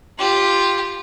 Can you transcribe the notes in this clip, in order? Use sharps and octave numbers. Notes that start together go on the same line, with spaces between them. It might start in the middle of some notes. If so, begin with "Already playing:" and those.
F4 G4